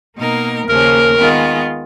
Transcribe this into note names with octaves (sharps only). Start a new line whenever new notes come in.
B2 A#3 D#4 A#4
D#2 C#3 F3 A#3 C#4 A#4
D#3 G#3 B3 F4